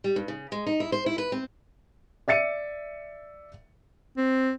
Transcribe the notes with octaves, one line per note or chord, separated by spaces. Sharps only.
G3
G2
C#3
G#3
D#4
E4
C5
E4
B4
C4
D5 E5 A6 C#7 D#7
C4